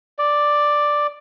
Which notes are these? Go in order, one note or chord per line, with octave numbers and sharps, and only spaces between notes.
D5